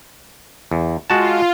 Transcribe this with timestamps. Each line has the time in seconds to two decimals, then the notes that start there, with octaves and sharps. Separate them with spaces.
0.72 E2
1.10 G#3 F4 F#4 A5